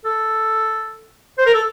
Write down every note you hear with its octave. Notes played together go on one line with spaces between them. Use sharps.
A4
C5
A#4
A4